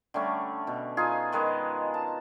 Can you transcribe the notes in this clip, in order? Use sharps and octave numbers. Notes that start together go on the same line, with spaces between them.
D3 G3 A3 C#4
B2
D#4 F4 G#4 G#5
D#3 G#3 B4 D#5
A5